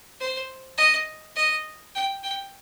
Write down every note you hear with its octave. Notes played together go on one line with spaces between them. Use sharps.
C5
D#5
D#5
G5
G5